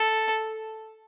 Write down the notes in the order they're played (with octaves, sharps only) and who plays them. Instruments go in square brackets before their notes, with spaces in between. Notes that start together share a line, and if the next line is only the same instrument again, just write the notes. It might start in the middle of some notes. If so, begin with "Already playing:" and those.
Already playing: [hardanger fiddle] A4